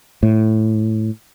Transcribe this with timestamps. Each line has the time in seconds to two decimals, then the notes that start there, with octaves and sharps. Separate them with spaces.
0.23 A2